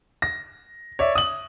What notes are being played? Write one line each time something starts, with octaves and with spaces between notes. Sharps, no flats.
A#6
C#5 D5 E5
D#6 F#7